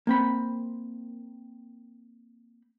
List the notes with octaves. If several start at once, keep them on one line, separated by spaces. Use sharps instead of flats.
A#3 C4 B5